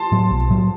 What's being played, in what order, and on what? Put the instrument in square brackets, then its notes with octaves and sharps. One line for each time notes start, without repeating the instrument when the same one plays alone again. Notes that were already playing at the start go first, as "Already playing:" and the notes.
Already playing: [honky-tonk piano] A5 C6
[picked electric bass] A2 F#3
B1
A2 F#3